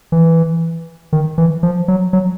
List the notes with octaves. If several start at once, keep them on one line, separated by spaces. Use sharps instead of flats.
E3
D#3
E3
F3
F#3
F#3